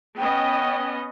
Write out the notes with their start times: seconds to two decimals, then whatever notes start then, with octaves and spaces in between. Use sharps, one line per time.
0.18 B3 C#4 D#5 G5